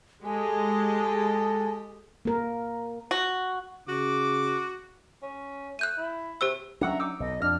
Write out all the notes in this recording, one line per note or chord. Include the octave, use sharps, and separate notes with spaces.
G#3 G4 A4 D#5 G#5
A#3 A#4
F#4
C#3 F#4 D6
C#4
A3 F#6 G6 D#7
E4
C3 G4 C5 E6
F#3 C#4 D4 E5 F#5 A#5
D#4 D6 E6
B1 D#5
F2 D4 F6